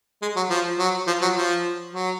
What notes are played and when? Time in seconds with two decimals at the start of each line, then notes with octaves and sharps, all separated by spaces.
0.22 G#3
0.36 F#3
0.50 F3
0.79 F#3
1.07 F3
1.22 F#3
1.36 F3
1.93 F#3